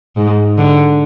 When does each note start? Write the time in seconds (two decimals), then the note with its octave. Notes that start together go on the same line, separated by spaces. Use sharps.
0.17 G#2
0.58 D3